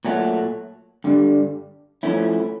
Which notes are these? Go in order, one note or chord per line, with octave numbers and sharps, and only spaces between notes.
A#2 F#3 A3
G2 D3 G3
F3 A3 C#4 E4